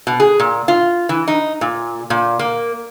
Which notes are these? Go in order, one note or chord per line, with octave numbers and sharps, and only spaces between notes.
B2
G#4
A#2
F4
E3
D#4
A#2
A#2
A#3